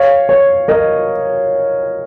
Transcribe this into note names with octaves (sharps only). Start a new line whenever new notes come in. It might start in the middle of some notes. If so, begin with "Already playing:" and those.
Already playing: C#5 F5
C#5
A#4 D#5